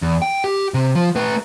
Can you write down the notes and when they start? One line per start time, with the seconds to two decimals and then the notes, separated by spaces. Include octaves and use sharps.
0.02 E2
0.22 G5
0.44 G4
0.74 C3
0.95 F3
1.16 A3 B4